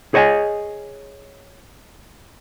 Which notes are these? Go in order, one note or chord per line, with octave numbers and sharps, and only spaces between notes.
G#4 C#5 D#5 G5 G#5